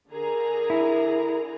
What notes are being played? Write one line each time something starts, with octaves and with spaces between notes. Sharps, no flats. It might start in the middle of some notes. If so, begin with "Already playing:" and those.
D3 G#4 A#4 A#5
E4